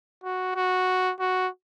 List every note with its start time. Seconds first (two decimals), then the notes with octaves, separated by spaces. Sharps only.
0.24 F#4
0.56 F#4
1.20 F#4